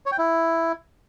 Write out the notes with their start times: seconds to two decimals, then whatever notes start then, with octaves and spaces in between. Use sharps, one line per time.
0.06 C#5
0.12 G5
0.18 E4